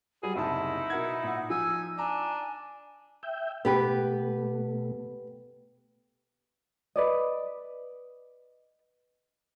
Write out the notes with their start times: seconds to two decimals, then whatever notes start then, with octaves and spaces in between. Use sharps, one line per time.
0.23 F#3 G3 G#4
0.36 F#1 C2 D#4 E4 A5
0.90 B2 A#4 F#5 G#6
1.23 A#2
1.50 F3 G#5 E6
1.98 D4 G#5 A#5
3.23 E5 G5
3.65 B2 A3 B3 G4 B4
6.96 B4 D5 D#5